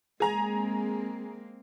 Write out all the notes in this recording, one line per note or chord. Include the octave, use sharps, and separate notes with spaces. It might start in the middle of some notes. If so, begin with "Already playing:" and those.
G#3 A#3 C4 G#4 G#5 A#5